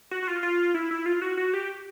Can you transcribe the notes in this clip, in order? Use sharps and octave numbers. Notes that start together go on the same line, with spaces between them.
F#4
F#4
F4
F4
E4
E4
F4
F#4
F#4
G4